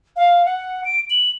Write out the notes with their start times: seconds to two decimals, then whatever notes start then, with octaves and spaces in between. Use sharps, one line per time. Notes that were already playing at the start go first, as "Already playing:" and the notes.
0.16 F5
0.45 F#5
0.85 D7
1.10 F#7